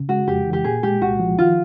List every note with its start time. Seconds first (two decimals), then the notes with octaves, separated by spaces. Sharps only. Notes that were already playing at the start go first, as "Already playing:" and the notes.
Already playing: C#3
0.09 G#3 F#4
0.27 F2 G4
0.45 E3
0.53 G4
0.64 A#2 G#4
0.83 G#3 G4
1.01 C2 F#4
1.20 F3
1.38 D#3 F4